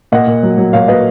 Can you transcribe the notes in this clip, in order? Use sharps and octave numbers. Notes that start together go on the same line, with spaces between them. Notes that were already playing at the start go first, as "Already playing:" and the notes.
A#2 D#5 F#5
A#2
F#3
F#3
A#2 C#5 F5
F#3 B4 D#5